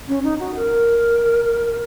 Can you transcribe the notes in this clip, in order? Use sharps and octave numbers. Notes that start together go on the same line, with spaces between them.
C#4
D#4
F#4
A#4